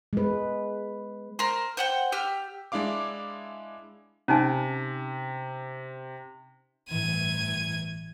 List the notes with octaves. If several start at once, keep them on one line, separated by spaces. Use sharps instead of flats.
G#3 B4
A#4 C5
C5 F#5 G5
G4 E6 F6
G#3 D4 E4 F5 D6
C3 C#4 D#4 G#5
G1 A2 E3 G#6 D#7